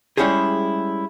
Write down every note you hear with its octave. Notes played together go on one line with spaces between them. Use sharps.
G3 G#3 C#4 E4 G4 G#4